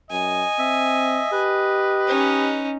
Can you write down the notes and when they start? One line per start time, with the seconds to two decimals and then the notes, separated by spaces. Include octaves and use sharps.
0.11 F#2 D#5 G#5
0.59 C4 E5
1.33 G4 B4
2.08 C#4 D#4